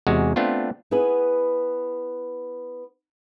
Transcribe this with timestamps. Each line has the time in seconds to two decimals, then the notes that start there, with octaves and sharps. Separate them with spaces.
0.07 E2 C3 G#3 F#4
0.36 A3 B3 C4 D4 F4
0.91 B3 E4 G#4 B4